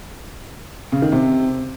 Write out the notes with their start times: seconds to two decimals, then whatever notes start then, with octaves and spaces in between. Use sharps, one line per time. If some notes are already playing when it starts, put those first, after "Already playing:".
0.92 C#3
1.02 D#3
1.12 C3